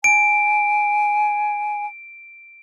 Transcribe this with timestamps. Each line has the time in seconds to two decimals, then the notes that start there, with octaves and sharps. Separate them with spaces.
0.04 G#5 D7